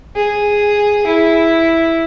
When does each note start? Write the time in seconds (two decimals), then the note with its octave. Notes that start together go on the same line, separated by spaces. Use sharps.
0.16 G#4
1.07 E4